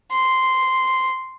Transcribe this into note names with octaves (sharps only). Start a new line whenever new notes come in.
C6